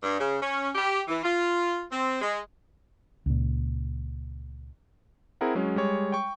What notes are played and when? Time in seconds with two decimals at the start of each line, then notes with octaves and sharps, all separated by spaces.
0.03 G2
0.18 C#3
0.41 C#4
0.75 G4
1.08 E3
1.22 F4
1.91 C4
2.20 G#3
3.26 C#2 A#2
5.41 C4 E4 G#4 A#4 F#5
5.55 F#3 G#3 C#4
5.76 G3 G#3 C#5
6.12 G5 C#6